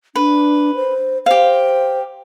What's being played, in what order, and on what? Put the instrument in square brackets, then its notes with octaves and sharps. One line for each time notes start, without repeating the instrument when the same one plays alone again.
[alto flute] D4 [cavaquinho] B4
[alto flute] C5
[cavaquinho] G4 F5 [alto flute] C5